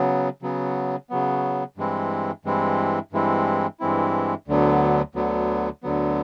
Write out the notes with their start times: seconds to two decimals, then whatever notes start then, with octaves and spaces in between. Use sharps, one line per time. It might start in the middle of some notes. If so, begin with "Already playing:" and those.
Already playing: C#3 F#3 B3
0.42 C#3 F#3 B3
1.10 C#3 F#3 B3
1.77 G2 E3 G#3 C4 E4
2.45 G2 E3 G#3 C4 E4
3.12 G2 E3 G#3 C4 E4
3.80 G2 E3 G#3 C4 E4
4.48 D2 D3 F#3 B3
5.15 D2 D3 F#3 B3
5.83 D2 D3 F#3 B3